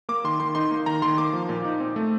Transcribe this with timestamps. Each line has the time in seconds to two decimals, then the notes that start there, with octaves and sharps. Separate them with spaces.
0.09 A#3 D6
0.24 D#3 C6
0.40 D#3 C6
0.55 D#4 C6
0.71 A#3
0.86 D#3 A#5
1.02 D#3 C6
1.18 A#3 D6
1.33 F3
1.49 A#2
1.65 D#4
1.80 C4
1.96 A3